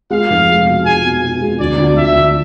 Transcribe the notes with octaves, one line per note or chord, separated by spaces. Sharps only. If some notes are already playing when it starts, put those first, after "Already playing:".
G#3 F5
F1
G#3
B2
G#3 G#5
B2
B2
G#3
D2 D5
D2
D2 E5
D2